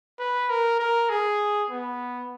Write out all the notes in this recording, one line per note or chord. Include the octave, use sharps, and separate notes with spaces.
B4
A#4
A#4
G#4
B3